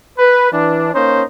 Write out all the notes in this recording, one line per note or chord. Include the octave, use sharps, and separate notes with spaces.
B4
E3 D4
A#3 C#4 D#4 C5